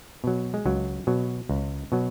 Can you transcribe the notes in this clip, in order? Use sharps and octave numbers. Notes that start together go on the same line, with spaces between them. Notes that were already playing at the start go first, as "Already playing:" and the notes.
B2 F#3
G#3
C#2 F#3
B2 F#3
C#2
B2 F#3